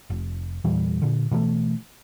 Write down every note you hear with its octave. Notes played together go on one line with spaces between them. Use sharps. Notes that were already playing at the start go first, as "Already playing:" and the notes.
F1
E2 A#2 E3 G3
A#2 D3
B2 E3 F#3 A3